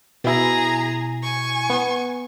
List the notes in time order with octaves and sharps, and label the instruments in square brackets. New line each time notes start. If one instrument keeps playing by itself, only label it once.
[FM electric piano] B2 E4 [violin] G#4 A#5
[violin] G#5 C#6
[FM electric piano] B3